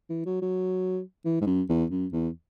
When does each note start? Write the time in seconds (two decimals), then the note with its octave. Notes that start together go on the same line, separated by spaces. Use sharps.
0.10 E3
0.26 F#3
0.42 F#3
1.25 E3
1.41 G#2
1.47 F#2
1.69 E2
1.91 F#2
2.13 E2